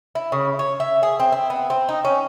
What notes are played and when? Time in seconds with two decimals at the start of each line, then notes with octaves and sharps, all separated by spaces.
0.15 E4
0.32 C#3
0.59 C#5
0.80 E5
1.03 G#4
1.20 C4
1.32 E4
1.50 B3
1.70 C4
1.89 D#4
2.05 C#4